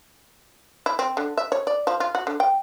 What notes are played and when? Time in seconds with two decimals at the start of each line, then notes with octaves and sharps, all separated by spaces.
0.86 E4
0.99 C4
1.17 D3
1.37 E5
1.52 C#5
1.67 D5
1.87 F3
2.00 F4
2.15 F#4
2.27 D3
2.40 G5